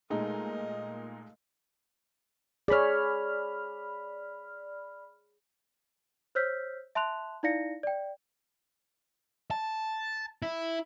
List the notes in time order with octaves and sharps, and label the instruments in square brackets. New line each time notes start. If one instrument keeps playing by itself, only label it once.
[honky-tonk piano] A#2 D#4 [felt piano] G#3 A3 [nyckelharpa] A#4 D#5
[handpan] G#4 C#5 [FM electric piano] D5 B5 F6
[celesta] C5 C#5 E6 F6 G6 B6
E5 A5 C6 F#6 F7
D#4 E4 D5 F5 A#6 C#7
D5 G5
[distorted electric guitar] A5
E4